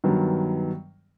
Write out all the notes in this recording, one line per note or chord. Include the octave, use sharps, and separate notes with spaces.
G2 D#3 F#3 B3